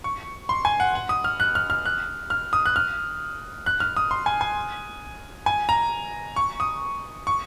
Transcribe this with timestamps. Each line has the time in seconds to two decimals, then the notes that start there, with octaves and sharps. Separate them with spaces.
0.04 C#6
0.49 C6
0.65 G#5
0.80 F#5
0.95 F#5
1.09 D#6
1.24 F6
1.40 F#6
1.55 F6
1.70 F6
1.85 F#6
2.30 F6
2.53 D#6
2.66 F#6
2.76 F6
3.66 F#6
3.80 F6
3.97 D#6
4.11 C6
4.26 G#5
4.41 G#5
5.46 G#5
5.69 A#5
6.36 C#6
6.60 D#6
7.27 C#6